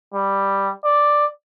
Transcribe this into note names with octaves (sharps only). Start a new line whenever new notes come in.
G3
D5